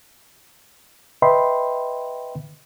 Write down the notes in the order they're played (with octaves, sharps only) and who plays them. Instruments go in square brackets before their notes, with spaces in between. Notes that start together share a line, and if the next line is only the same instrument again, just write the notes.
[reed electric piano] B4 D#5 E5 G5 B5 C6